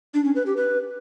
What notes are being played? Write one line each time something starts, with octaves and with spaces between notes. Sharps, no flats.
D4
C#4
B4
G4
B4